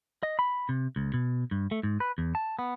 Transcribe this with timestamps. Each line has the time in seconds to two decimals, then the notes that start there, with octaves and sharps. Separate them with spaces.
0.23 D#5
0.39 B5
0.69 C3
0.96 C#2
1.14 B2
1.51 G2
1.71 A3
1.83 G#2
2.00 B4
2.18 E2
2.35 A5
2.59 B3